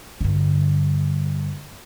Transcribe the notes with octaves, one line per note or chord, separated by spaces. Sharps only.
G2 D3